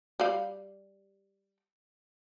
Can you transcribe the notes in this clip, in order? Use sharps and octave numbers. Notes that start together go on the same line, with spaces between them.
G3 F5